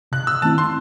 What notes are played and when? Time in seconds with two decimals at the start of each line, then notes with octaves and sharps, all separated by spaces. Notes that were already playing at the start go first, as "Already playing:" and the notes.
0.12 C3 F#6
0.27 E6
0.42 D#3 A3 C4 E4 A5
0.58 C6